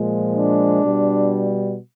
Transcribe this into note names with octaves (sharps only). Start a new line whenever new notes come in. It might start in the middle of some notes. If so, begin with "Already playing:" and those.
Already playing: A#2 F3 G#3
D4
B2 G3